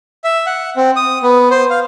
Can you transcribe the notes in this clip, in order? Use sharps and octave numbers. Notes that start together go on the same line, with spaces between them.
E5
F#5
C4
D#6
B3
C5
F5